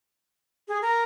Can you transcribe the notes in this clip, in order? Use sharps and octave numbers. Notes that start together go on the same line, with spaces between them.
G#4
A#4